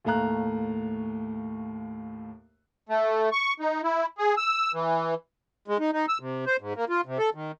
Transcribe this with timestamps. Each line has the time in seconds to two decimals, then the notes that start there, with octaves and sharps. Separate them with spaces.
0.05 D#2 A2 A3 F5 A#5 F#6
2.89 A3
3.32 C#6
3.60 D#4
3.83 E4
4.18 G#4
4.37 E6
4.74 E3
5.68 G#3
5.80 D#4
5.93 D#4
6.09 E6
6.20 C3
6.46 C5
6.61 G#2
6.76 A#3
6.89 F4
7.06 C3
7.19 A4
7.34 D#3